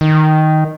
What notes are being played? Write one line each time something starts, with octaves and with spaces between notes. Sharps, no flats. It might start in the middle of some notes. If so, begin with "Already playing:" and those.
D#3